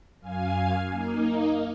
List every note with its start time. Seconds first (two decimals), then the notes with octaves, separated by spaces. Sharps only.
0.20 F#2 F5 G#5
0.90 A#3 D#4